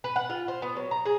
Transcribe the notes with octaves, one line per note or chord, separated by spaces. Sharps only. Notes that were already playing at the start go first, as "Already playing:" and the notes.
B4
F#5
F4
C5
B3
F#3
A#5
G#4